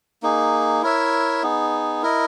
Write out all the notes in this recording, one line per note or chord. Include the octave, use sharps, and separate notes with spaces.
A#3 D#4 G#4
E4 A#4 C#5 E5
B3 D#4 G#4
E4 A#4 D#5